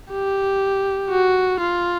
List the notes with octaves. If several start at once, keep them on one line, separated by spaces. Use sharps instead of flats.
G4
F#4
F4